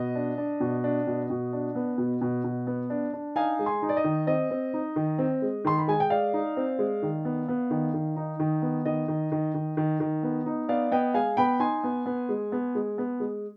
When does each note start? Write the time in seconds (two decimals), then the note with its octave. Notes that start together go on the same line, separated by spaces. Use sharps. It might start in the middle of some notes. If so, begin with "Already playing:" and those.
Already playing: B2 D#5
0.15 D4
0.38 D4
0.60 B2
0.84 D4
1.07 B2
1.30 B2
1.53 D4
1.75 B3
1.98 B2
2.21 B2
2.44 B2
2.67 B3
2.90 D4
3.13 D4
3.36 D#4 F5 G#5
3.59 G#3
3.66 G#5 C6
3.82 D#4
3.89 D5
3.97 D#5
4.04 D#3
4.27 C4 D#5
4.51 C4
4.74 D#4
4.96 D#3
5.18 C4
5.42 G#3
5.65 D#3 C6
5.78 B5
5.88 G#3 G#5
6.00 G5
6.10 G#3 D5 F5
6.34 D#4
6.57 C4
6.79 G#3
7.02 D#3
7.25 B3
7.48 B3
7.71 D#3
7.94 D#3
8.16 D#4
8.40 D#3
8.62 B3
8.85 D#3 D#5
9.08 D#3
9.32 D#3
9.54 D#3
9.77 D#3
10.00 D#3
10.23 B3
10.46 D#4
10.69 B3 D5 F5
10.91 B3 D#5 G5
11.14 G#3 F5 G#5
11.37 B3 G5 B5
11.60 D#4 G#5 C6
11.84 B3
12.06 B3
12.29 G#3
12.52 B3
12.75 G#3
12.98 B3
13.20 G#3